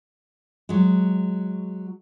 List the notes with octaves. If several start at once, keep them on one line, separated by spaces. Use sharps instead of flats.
F#3 G#3